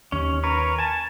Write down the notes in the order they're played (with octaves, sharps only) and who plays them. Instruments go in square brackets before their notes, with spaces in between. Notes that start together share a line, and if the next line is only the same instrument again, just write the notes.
[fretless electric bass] D#2 [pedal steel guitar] C#4
[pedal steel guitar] A#4 B4 C#5
G#5 A5